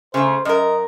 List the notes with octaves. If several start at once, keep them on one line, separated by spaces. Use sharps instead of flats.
C#3 A3 C5
F#2 A#4 D#5